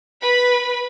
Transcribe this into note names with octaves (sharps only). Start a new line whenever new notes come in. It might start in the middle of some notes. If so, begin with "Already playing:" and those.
B4 B5